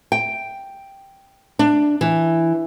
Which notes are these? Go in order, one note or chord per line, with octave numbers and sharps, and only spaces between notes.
G5
D4
E3